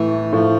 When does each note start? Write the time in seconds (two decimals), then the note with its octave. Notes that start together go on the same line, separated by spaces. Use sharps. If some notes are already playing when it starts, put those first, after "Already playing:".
Already playing: A2 E3 A3
0.33 A2 F3 A3